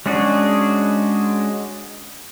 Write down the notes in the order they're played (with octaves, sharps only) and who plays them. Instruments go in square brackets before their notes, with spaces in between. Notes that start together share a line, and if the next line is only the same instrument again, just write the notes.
[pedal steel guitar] G#3 C#4 D4 F#4 G#4